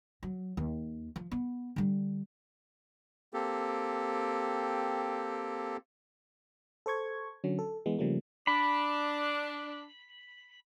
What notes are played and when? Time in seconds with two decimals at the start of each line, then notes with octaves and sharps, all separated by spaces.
0.23 F#3
0.57 D#2
1.16 F3
1.32 B3
1.76 D3 G3
3.34 A#3 C4 G4 A4
6.86 A4 C5 C#6 G#6
7.44 D3 F#3 C#4
7.59 A4
7.86 E3 G#3 B3
7.99 C#3 F3 G3 A3 A#3
8.47 D4 B5